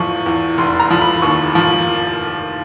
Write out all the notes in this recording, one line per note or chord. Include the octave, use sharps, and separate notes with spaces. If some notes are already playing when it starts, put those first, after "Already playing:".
Already playing: E2 F3 C#6
E2
F1 C6
A#5
F3
B5
D#2 C#6
F3